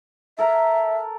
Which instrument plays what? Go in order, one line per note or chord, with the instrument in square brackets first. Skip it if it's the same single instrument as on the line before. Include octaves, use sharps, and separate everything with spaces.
[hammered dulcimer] A4 A#4 A#5 [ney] E5